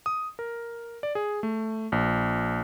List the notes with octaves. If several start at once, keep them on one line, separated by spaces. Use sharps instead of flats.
D#6
A#4
D5
G#4
A3
A#1